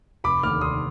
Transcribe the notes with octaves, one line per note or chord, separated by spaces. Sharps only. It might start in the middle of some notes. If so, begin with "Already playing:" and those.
F1 B5 D6
D#2 D3 D6 F6
F1 C6 D#6